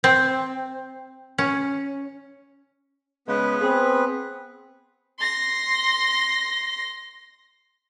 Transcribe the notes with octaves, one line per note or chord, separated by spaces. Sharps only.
C4
C#4
C#3 G#3 B3 B4
C4 G#4
C6 A#6